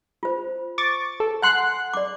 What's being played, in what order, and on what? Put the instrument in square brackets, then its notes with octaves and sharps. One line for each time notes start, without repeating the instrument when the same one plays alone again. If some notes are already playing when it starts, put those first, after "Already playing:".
[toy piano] F4 C5
[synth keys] C#6 D6 A6
A4
[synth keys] F#5 F#6 C7 [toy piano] G#5 C6
[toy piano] D5 D6